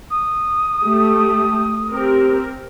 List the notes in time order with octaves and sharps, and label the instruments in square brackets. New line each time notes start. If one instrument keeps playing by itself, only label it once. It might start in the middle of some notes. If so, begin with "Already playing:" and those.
[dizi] D#6
[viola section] A3 G4
C4 G4 A#4